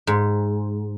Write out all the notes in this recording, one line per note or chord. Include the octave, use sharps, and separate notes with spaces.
G#2